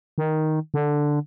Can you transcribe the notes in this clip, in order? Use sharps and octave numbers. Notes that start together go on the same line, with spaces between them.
D#3
D3